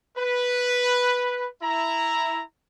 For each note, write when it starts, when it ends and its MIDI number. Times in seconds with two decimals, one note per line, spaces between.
0.17 1.47 71
1.62 2.42 64
1.62 2.42 82